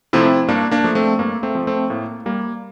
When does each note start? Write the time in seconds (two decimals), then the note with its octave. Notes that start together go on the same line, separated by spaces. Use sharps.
0.13 C3 F3 A3 C4 E4
0.48 G2 A#3 D4
0.71 A#3 D4
0.84 F3 A3
0.95 A3 C4
1.19 G2 A#3
1.43 A3 C4
1.55 F3 A3
1.67 A3 C4
1.90 A2 A#3
2.26 G3 A#3